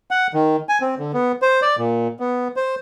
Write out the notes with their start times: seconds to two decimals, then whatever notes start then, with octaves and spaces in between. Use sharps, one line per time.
0.11 F#5
0.34 D#3
0.69 G#5
0.81 C4
0.98 D3
1.14 B3
1.42 C5
1.62 D5
1.78 A#2
2.20 B3
2.56 C5